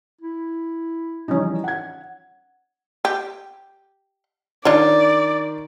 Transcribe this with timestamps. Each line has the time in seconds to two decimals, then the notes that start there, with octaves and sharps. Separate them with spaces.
0.21 E4
1.28 E3 F3 G3 C#4 D#4
1.64 F#5 G#6
3.05 G4
4.65 D#3 D4 F4 C#5 D5